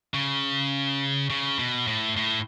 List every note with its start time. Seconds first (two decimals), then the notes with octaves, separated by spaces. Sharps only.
0.14 C#3
1.30 C#3
1.59 B2
1.87 A2
2.17 A2